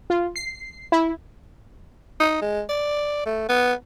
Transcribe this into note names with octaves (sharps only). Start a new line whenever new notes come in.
F4
C7
E4
D#4
G#3
D5
A3
B3